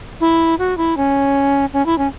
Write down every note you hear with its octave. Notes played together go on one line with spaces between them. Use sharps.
E4
F#4
E4
C#4
C#4
E4
C#4